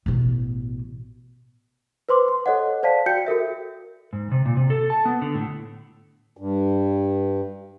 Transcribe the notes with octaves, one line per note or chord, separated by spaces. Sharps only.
A1 B2
B4 C5 C6 D6
C6
A4 C#5 D#5 F#5
C5 D5 F5 A5 B6
F#4 G5 G6 C#7
F#4 A4 A#4 E5
G#2
C3
A#2
C3
A4
A5
B3
D3
A2
G2